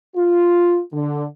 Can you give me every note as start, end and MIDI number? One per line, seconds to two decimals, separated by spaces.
0.16 0.80 65
0.93 1.24 50